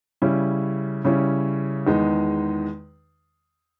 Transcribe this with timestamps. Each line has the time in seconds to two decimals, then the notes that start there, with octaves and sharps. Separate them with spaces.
0.22 C#3 G3 C#4 E4
1.05 C#3 G3 C#4 E4
1.87 E2 D#3 G#3 D#4